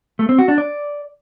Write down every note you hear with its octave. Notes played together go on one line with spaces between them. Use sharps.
A3
C4
F#4
D4
D5